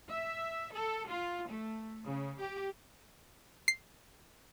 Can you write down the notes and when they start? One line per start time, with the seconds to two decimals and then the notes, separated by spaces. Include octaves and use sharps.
0.10 E5
0.73 A4
1.08 F4
1.49 A3
2.05 C#3
2.40 G4
3.68 C7